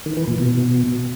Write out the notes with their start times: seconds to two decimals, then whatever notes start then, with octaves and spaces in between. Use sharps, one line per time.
0.06 D#3
0.17 E3
0.28 A#2
0.38 B2